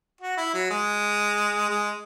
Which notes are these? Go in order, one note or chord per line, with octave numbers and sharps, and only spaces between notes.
F#4
E4
F#3
G#3
G#3